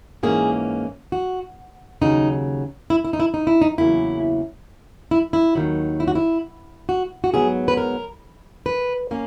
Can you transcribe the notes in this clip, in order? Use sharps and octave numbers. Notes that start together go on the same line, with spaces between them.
G#2 E3 A#3 C#4 G#4
F#4
D#2 C#3 F#3 D#4
E4
E4
D#4
E4
D#4
E4
D#4
E2 C#3 F#3 A#3 E4
E4
E4
D#2 D#3 F#3
E4
F#4
E4
F#4
F#4
G#2 F#3 B3 G#4
B4
A#4
B4
A#3 C#4